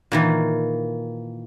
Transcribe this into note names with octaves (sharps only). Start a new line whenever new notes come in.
A#2 D#3 E3